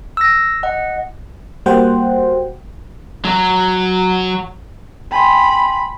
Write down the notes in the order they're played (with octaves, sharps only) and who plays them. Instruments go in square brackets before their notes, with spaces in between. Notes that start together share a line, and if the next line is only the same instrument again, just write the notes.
[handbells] E6 A#6
D#5 F#5
[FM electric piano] G3 A#3 F#4 C5 F#5 G5
[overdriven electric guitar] F#3
[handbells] G5 G#5 C6 [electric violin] B5